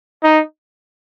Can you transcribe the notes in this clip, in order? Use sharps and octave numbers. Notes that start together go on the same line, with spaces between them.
D#4